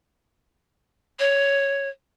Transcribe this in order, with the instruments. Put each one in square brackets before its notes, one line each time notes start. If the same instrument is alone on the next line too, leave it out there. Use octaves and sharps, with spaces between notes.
[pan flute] C#5